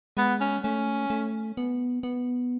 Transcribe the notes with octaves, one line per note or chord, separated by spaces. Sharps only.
G#3 B3
C#4
A3 C#4
A3
B3
B3